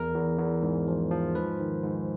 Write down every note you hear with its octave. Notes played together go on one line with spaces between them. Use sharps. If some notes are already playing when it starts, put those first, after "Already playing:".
Already playing: E2 A#4
E2
E2
G#2
F3
F3
G#2 B4
D#3
G#2